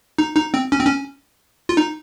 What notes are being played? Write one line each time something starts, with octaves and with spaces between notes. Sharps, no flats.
D#4
D#4
C4
C#4
C4
C#4
F4
D#4